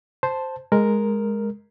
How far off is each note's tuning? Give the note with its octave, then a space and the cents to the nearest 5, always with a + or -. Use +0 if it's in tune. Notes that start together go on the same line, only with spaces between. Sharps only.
C5 +0 A5 +0
G#3 +0 A#4 +0